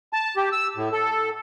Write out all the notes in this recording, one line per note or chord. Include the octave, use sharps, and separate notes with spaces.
A5
G4
E6
A2
A4